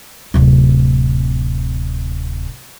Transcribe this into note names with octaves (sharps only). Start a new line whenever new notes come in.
D1 C3